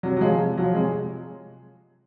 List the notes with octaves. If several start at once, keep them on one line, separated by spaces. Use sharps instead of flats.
C3 F#3
F#3
F3 G#3
C3
F3 F#3
C3 G#3